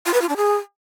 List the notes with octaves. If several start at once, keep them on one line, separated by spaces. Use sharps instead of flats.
F4
B4
F4
D4
G#4